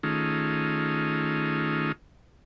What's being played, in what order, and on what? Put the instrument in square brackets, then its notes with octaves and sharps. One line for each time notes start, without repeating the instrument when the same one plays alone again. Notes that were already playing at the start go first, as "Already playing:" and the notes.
[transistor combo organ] D#3 A3 C#4 D#4 F4 G#4